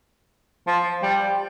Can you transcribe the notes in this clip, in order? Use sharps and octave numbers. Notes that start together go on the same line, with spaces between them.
F3
G3